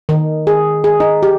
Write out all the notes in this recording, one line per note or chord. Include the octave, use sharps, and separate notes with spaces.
D#3
G#4
G#4
D#4
G4